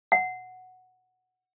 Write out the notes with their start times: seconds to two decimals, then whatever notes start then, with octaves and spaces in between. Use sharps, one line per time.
0.12 F#5